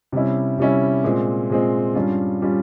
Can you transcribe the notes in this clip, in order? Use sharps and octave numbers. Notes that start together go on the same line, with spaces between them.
C3 G3 C#4 E4
C3 G3 C#4 E4
A#2 G#3 C4
A#2 G#3 C4
G2 G3 C#4 F4
G3 C#4 F4